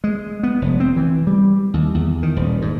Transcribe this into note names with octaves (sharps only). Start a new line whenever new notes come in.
G#3
B3
F1
C4
E3
G3
D#2
E2
D#3
D#1
G#2